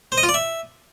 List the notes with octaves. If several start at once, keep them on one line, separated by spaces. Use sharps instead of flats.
C5
D#5
F4
D5
E5